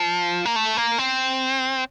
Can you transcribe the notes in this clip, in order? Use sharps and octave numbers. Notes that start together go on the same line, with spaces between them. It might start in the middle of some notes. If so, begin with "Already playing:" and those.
Already playing: F3
A#3
A3
A#3
C4